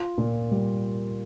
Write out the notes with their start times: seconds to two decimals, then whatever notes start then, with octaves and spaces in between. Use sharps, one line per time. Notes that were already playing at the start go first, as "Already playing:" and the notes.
Already playing: F4
0.18 A#2
0.52 G3